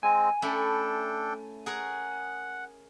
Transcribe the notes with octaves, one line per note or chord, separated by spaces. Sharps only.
G#3 C4 G#5
A3 C#4 D4 E4 A4 G5
G#4 A#4 C#5 F#5